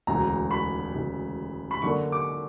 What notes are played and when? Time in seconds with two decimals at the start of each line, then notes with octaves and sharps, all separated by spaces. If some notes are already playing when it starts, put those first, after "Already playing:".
0.07 E1 D2 C#3 A#5
0.51 B5
0.94 E1 D2 C#3
1.71 B5
1.82 F#2 D3 F#3 A#3 D4 C#6
2.12 D6